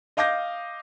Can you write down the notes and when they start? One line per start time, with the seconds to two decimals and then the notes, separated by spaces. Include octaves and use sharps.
0.17 D#5 F5 D6 G6 A#6